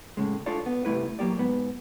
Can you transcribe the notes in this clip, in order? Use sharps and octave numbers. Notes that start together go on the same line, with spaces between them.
A2 C#3 G#3
D4 F4 A4 C#5 D5
B3
C3 G3 A3 E4 B4
F#3 G#3 A#3 G4 D5
G#2 B3